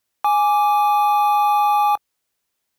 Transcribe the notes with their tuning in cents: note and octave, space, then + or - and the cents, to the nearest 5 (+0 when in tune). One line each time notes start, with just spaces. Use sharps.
G#5 +0 D6 -5